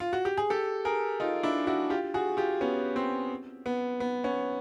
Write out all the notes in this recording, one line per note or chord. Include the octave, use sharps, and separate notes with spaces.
F4
F#4
G4
G#4
G4 A4
G#4 A#4
D#4 F4
D4 E4
E4 F#4
F4 G4
F#4 G#4
F4 G4
B3 C#4
C4
B3
B3
B3 C#4